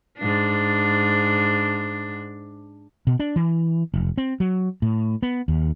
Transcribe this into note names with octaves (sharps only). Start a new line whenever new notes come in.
G#2 D4
B2
D4
E3
F1
C4
F#3
A2
B3
D#2